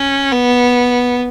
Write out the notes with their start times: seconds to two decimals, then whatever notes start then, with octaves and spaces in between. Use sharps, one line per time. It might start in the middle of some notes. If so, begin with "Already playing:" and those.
Already playing: C#4
0.31 B3